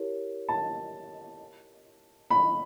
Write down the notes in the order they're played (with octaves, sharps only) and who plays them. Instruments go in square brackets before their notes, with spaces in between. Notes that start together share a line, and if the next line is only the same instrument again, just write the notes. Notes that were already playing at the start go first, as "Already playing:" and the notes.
Already playing: [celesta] E4 G4 A#4 C#5
[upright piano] A5
B5